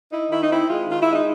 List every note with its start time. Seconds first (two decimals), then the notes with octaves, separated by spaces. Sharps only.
0.12 D#4 E4
0.31 D#3 E4
0.42 D#4
0.50 C4 E4
0.69 G#3 F4
0.89 D#3 F4
1.01 E4
1.08 G#3 D#4